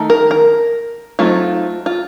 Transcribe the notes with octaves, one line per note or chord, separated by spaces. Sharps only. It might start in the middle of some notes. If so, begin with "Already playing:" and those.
Already playing: D#3 A3 D#4
A#4
A#4
F#3 A3 C4 D#4 F4
F4